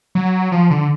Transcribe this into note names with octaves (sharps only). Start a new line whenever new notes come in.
F#3
F3
D3